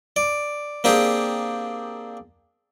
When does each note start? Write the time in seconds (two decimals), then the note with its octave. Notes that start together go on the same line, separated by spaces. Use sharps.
0.16 D5
0.84 A#3 C4 D4 G4 G#4